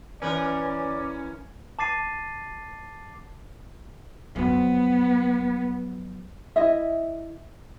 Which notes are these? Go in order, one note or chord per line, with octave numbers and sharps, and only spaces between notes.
E3 C#4 A#4 B4 D5
A5 D6 A6 C7 D#7
F2 F#3 B3
E4 D#5 E5